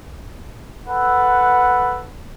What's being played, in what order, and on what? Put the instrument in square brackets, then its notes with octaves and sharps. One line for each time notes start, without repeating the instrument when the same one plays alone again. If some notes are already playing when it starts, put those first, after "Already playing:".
[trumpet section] A4 B4 [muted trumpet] F#5